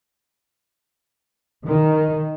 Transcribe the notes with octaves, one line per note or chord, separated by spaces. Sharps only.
D#3